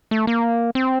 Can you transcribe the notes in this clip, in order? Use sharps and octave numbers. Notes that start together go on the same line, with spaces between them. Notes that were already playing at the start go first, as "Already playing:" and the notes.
A3
A#3
C4